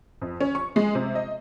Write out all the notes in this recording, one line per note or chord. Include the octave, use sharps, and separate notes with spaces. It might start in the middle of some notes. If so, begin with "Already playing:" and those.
F2
C#4
C#6
G#3
C3
D#5